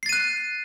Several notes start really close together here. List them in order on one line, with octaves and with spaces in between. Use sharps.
C7 A6 D#7 F#6